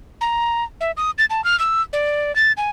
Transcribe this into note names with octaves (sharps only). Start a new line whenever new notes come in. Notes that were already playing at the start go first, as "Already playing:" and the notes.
A#5
E5
D#6
A6
A5
F6
E6
D5
A6
G#5